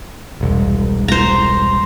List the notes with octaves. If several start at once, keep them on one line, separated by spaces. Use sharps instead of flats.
E1 C2
C5 A#5